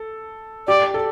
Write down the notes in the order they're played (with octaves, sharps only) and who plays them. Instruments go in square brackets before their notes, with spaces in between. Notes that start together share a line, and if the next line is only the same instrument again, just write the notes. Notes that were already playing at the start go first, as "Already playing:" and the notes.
Already playing: [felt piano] A4
[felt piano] G4 [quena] D5
[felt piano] A4